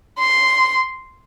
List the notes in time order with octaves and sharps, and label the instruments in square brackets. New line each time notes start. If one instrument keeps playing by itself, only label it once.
[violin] C6